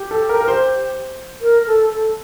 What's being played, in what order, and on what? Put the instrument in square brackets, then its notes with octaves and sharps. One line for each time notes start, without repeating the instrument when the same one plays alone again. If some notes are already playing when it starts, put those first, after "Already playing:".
Already playing: [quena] G4
[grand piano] A4
A#4
A#4
C5
[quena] A#4
A4
A4